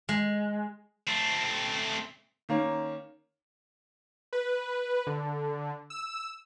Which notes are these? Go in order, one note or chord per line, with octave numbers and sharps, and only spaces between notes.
G#3
A3 C4
D#3 A#3 C#4
B4
D3
E6